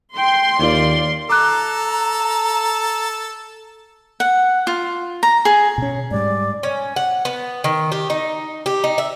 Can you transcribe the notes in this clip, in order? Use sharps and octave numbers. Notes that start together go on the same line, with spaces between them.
G5 C6
D#2 F4 D5
A4 A#5 D6 F#6
F#5
F4
A#5
G#4
B2 C#4
G#2 G3 D5
C#4
F#5
B3
D#3
G4
D#4
G4
D#4
E5